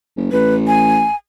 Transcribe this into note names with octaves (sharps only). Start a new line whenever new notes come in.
F#1
A1 B4
G#5